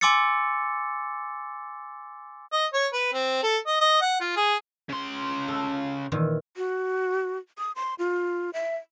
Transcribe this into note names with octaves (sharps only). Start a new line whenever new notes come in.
G#5 C6 D6 E6 A6 C#7
D#5
C#5
B4
C4
A4
D#5
D#5
F#5
F4
G#4
C#3 C6
A4
A#2 D#3 E3
F#4
D#6
C6
F4
E5